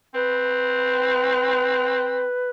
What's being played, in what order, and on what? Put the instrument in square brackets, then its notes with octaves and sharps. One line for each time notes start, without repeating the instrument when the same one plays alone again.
[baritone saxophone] C4 [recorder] B4